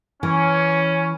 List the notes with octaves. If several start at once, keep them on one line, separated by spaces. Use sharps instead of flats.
E3 C#4